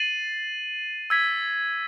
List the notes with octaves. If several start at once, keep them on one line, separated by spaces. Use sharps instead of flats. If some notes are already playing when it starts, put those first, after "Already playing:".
Already playing: A6 C7 D#7 F#7
E6 G#6 B6